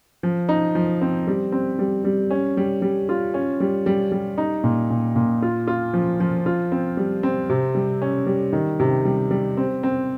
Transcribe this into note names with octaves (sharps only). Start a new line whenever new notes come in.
F3
D#4
F3
C4
G3
C4
G3
G3
C#4
G3
G3
F4
C#4
G3
G3
G3
D#4
A#2
A#2
A#2
F4
F4
F3
F3
F4
C4
G3
C4
C3
G3
C#4
G3
D#3
C3
G3
G3
C4
C4